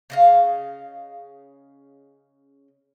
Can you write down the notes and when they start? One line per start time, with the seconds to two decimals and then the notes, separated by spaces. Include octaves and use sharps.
0.10 C#3 D#5 F5